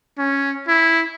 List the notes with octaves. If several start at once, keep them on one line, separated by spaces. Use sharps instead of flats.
C#4
E4